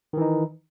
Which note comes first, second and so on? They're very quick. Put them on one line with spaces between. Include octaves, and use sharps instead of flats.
D#3 E3 D#4